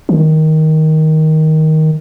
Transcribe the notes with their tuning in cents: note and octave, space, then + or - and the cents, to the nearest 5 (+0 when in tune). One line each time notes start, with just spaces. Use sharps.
D#3 +10